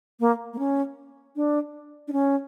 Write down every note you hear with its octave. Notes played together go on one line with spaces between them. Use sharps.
A#3
A#3
C#4
D4
D4
C#4